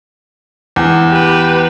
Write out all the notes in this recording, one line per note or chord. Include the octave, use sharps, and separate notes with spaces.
E2
G4 B4